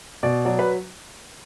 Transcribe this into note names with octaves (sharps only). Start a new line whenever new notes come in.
B2 D5
F#3 D5
B4